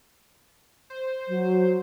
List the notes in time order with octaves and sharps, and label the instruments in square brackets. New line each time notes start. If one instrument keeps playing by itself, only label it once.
[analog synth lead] C5
[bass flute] F#3